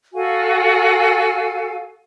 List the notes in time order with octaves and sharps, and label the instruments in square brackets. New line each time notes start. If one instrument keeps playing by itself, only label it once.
[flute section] F#4 A4 F5 G#5